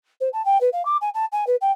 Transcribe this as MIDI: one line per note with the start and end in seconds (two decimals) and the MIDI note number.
0.21 0.29 72
0.33 0.44 81
0.45 0.60 79
0.61 0.69 71
0.73 0.85 77
0.85 0.97 86
1.01 1.09 80
1.14 1.25 81
1.32 1.45 80
1.47 1.56 71
1.61 1.71 79